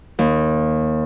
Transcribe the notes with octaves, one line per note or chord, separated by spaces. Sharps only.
D#2